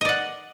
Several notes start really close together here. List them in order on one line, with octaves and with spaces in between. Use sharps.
D#5 D5 F#5